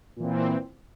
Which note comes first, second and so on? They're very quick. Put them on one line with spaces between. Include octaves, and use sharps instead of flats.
A#2 E3 C4